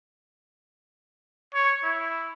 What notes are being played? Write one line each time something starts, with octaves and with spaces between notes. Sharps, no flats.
C#5
E4